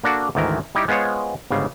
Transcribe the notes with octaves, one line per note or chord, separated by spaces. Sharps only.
A#3 D4 F#4 A4 F#5
D2 G#2 D#3 E3 A#4
G3 D#4 E4 G4
G#3 B3 F4 C5 C#5
G1 G#2 C#3 G3 F5